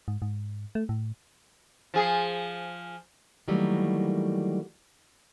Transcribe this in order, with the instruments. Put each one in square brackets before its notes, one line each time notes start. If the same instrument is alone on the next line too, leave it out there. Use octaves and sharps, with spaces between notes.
[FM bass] G#2
G#2
A3
A2
[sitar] F3 G#4
[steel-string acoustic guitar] D#3 E3 F#3 G3 A3 A#3